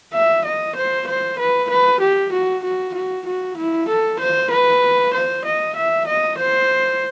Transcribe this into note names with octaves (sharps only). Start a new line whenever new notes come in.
E5
D#5
C5
C5
B4
B4
G4
F#4
F#4
F#4
F#4
E4
A4
C5
B4
C5
D#5
E5
D#5
C5